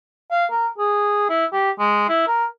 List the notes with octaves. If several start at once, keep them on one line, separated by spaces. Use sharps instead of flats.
F5
A#4
G#4
E4
G4
G#3
E4
A#4